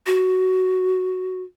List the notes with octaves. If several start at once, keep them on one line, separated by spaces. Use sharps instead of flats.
F#4